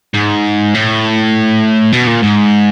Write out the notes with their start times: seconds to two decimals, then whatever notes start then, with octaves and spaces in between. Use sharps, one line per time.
0.14 G#2
0.74 A2
1.92 B2
2.07 A#2
2.22 G#2